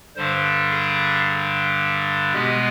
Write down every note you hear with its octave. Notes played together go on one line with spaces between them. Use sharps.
G2 D3 G3 C5
G#4
B2 G#3 B3 G4